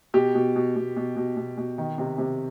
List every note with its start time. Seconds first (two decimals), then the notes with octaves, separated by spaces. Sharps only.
0.14 B2 G4
0.35 B2
0.56 B2
0.76 B2
0.96 B2
1.16 B2
1.37 B2
1.57 B2
1.78 D#3
1.98 C3
2.18 C3